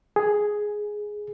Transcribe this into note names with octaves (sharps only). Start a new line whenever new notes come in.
G#4